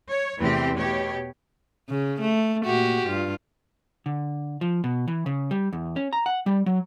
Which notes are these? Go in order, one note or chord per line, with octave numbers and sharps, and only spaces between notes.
C#5
E2 C3 E3 A3 C4 G4
B2 G4 C#5
C#3
A3
A#2 F#4 G4
G2 F4
D3
F3
B2
E3
C#3
G3
E2
C#4
A#5
F#5
G3
F#3